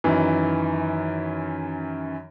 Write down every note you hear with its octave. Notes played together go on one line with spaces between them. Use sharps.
F#2 D#3 E3